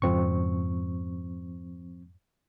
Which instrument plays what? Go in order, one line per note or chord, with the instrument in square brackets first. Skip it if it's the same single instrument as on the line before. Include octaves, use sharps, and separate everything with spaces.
[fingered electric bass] F2 G#2 C#3 [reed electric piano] F3 C4 C#6